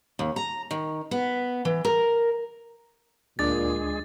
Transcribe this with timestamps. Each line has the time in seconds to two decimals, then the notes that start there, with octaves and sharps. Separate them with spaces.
0.19 D#2
0.36 A#5
0.71 D#3
1.11 B3
1.65 E3
1.85 A#4
3.39 D2 A#2 G#3 D4 G#4 D6 A6